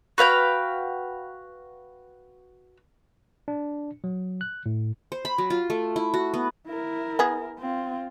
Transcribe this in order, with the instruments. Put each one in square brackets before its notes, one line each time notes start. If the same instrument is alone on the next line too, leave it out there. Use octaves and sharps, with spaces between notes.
[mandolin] F#4 B4 F5 G5
[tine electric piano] D4
F#3
F#6
A2
[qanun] C5
B5
F#3
F4
A3
E4
F#4
B3
[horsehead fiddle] E4 A#4
[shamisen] B3 G#4
[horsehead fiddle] C4 F4